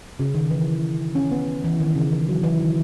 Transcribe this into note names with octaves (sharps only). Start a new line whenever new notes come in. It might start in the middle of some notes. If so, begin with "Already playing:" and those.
C#3
D#3
E3
C#4
B3
E3
D#3
C#3
E3
F#3
E3
D#3